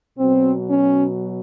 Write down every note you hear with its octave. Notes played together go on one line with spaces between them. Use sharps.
B2 F#3 C4
C#4